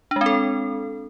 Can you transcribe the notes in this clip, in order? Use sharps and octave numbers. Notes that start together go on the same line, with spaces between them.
G#3 C4 D4 A4